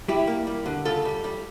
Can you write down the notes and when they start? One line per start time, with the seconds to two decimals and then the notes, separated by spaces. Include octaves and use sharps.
0.08 G3 E4 G4
0.27 A#3
0.47 G3
0.66 D3
0.85 C#3 F4 A4
1.05 G3
1.24 G3